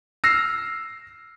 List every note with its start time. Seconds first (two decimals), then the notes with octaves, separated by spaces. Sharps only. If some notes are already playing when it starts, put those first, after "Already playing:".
0.24 E6 F6 A#6 C7